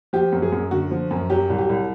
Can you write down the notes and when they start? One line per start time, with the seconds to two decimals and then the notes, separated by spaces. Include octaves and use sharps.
0.13 F3 G4
0.32 F#2
0.42 G#4
0.52 F#2
0.71 D3 F#4
0.91 F3
1.11 F#2
1.30 F#3 G4
1.50 C2
1.59 G4
1.69 C2